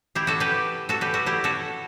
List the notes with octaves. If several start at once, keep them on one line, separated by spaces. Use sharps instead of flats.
E4 G4
F#4 A4
G4 B4
F#4 A4
G4 B4
F#4 A4
E4 G4
F#4 A4